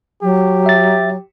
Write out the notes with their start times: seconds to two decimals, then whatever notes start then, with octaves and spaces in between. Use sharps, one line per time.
0.23 F#3 G4
0.66 E5 A6